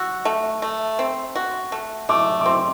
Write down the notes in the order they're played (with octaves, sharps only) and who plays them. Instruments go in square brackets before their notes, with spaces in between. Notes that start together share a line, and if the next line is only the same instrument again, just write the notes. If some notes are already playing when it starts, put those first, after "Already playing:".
Already playing: [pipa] F#4 [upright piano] E6
[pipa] A3
A3
C4
F#4
A3
[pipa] A3 [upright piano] D6
[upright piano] D6
[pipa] C4 [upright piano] C6